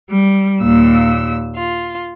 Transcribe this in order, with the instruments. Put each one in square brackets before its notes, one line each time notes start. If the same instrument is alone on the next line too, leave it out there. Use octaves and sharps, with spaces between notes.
[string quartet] G3
D#2 A#2 E6
F4